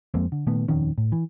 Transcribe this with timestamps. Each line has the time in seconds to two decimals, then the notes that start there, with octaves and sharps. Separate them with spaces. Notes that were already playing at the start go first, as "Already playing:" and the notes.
0.14 F2 G#3 A#3 C4
0.32 D3
0.47 A#2 D#3 A3 B3
0.68 D#1 F2 D#3 C#4
0.98 A2
1.12 E3